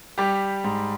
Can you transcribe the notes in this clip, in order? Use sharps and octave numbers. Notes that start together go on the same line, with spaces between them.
G3 G4
G#2